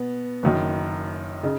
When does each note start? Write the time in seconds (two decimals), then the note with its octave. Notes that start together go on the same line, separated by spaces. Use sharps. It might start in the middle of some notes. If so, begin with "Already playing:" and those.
Already playing: B2 B3
0.43 F#1 F#2 D#3
1.43 C#3 D#4